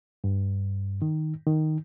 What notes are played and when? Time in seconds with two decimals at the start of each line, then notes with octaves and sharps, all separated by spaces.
0.24 G2
1.02 D#3
1.47 D#3